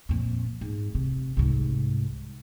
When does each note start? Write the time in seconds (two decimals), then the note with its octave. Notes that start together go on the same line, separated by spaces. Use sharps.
0.09 F2 A#2
0.61 G#2
0.95 C3
1.37 C2 G#2